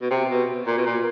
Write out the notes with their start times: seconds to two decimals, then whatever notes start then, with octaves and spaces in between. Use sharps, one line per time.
0.01 B2
0.10 C3
0.29 B2
0.67 A#2
0.78 B2
0.86 A#2